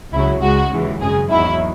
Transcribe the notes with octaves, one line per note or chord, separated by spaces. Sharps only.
C#2 C#3 F#3 E4
C#2 C#3 G#3 F#4
D#2 C#3 E3 G#3
G#1 F#2 C#3 G#3 G#4
E2 D#3 F#3 E4